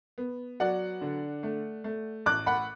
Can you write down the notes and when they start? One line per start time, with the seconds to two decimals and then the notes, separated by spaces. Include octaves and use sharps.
0.18 B3
0.60 F#3 D5 F#5
1.01 D3
1.43 A3
1.84 A3
2.26 A1 D6 F#6
2.46 F#5 B5